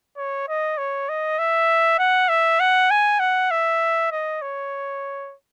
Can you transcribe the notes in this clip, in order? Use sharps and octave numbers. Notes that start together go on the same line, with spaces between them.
C#5
D#5
C#5
D#5
E5
F#5
E5
F#5
G#5
F#5
E5
D#5
C#5